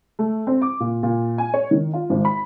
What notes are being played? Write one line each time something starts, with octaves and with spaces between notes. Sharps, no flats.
A3
C4
D6
A#2
A#2
G#5
C#5
D#3
F4
G#1
B5